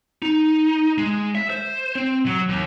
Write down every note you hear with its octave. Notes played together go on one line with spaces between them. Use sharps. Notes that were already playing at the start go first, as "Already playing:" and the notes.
D#4
G#3
E5
C5
C4
F#3
D#2